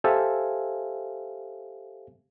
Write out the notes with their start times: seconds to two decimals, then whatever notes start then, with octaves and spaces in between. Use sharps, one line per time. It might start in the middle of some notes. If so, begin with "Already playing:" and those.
0.04 G4 A4 C5 E5 F5 G#5